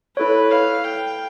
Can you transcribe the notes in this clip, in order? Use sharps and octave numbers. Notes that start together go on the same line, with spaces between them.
E4 A4 B4 C#5
F5
G5